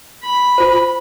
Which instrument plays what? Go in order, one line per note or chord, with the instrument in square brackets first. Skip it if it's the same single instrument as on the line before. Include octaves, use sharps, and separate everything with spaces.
[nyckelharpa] B5
[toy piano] F4 C5